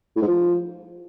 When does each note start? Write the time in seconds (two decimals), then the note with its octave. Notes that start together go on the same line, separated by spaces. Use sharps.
0.16 A2
0.22 G#2
0.28 F3